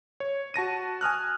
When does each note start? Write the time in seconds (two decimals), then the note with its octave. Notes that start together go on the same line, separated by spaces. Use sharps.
0.20 C#5
0.54 F#4 A5 A#6 D#7
1.01 G#5 D#6 F6 F#6